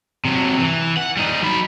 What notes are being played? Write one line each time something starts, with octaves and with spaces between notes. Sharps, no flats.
C3 F#3
E3
F#5
G3 D#4
F#3 B5